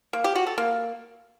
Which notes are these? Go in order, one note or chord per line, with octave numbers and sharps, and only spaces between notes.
A#3
G4
F#4
A4
A#3